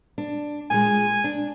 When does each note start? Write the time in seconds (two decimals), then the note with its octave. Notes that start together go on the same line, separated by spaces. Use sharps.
0.18 D4
0.70 A#2 G#3 G#5
1.24 D4